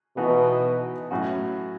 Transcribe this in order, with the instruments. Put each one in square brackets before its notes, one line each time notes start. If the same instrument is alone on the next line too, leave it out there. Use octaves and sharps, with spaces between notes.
[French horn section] B2 [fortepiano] E3 B3 D#4 F#4
[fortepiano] A2 F#3 C#4 F#4